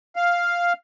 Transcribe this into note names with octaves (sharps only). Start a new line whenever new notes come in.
F5